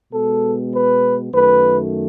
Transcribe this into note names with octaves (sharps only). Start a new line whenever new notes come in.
B2 G#3 B3 A4
B4
F#2 D#3 A3 B4